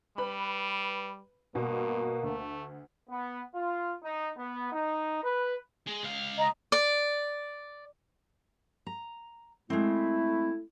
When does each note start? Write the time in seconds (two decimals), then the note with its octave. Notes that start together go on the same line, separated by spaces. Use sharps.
0.18 G3 B4 B5
1.55 G2 B2 A#3
2.23 D2 A3
3.09 B3
3.54 F4
4.03 D#4
4.37 B3
4.73 D#4
5.24 B4
5.87 G#3
6.03 C#2 F5
6.38 D#5 A#5
6.72 D5
8.87 A#5
9.70 G#3 A3 C4 E4